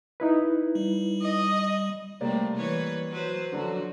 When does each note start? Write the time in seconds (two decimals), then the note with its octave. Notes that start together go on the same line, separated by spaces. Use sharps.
0.20 D#4 E4 B4
0.75 G3
1.21 D#5
2.21 C3 G3 A3 A#3 D4 D5
2.57 E3 B4 C#5
3.10 F#3 B4 C5
3.53 D3 F3 F#3 F#4